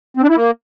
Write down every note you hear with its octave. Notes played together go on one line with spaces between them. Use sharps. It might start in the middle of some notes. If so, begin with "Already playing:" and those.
C4
D4
E4
A#3